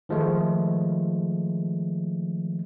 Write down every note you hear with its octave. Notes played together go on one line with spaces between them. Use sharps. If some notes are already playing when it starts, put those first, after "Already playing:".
D#3 F3 G#3 A3